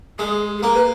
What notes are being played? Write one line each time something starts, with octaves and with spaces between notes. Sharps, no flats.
G#3 G#4
G#4
A#3 A#4
B4